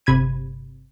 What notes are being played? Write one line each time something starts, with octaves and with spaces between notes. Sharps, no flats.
G1 C3 B5 G#6 D#7